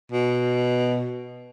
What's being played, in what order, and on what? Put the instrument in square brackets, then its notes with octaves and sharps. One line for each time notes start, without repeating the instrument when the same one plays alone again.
[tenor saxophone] B2